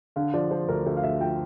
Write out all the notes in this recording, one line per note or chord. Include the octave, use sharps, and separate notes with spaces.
D3 F5
F3 D5
F3 C5
D2 A#4
D2 C5
F5
D2 E5
F3 G5